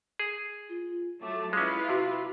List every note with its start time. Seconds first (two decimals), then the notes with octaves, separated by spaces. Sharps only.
0.19 G#4
0.69 F4
1.22 F#3 A3 D6
1.53 G#3 C#4 E4 F4 B4
1.89 C3 F#4